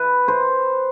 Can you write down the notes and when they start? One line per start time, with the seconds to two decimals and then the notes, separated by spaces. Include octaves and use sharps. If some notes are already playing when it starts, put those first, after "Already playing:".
Already playing: B4
0.28 C5